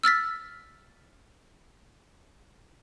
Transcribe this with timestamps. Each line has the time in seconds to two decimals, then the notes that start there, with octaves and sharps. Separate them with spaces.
0.04 E6 F6 A6 B6